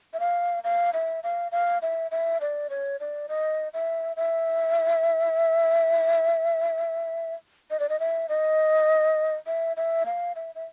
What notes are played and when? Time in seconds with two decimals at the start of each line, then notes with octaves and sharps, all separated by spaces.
0.13 E5
0.20 F5
0.64 F5
0.93 E5
1.23 F5
1.52 F5
1.82 E5
2.11 E5
2.41 D5
2.70 C#5
3.00 D5
3.29 D#5
3.74 E5
4.17 E5
7.71 D#5
7.80 D5
7.89 D#5
8.00 E5
8.29 D#5
9.47 E5
9.77 E5
10.06 F5
10.36 E5
10.55 E5